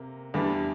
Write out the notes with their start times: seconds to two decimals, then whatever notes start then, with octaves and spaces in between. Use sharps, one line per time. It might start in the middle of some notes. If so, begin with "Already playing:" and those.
Already playing: C3 A#3
0.34 E2 E3 G3 D4